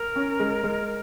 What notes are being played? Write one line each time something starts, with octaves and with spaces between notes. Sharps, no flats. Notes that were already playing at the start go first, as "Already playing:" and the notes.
Already playing: A#4
C#4
G#3
G#3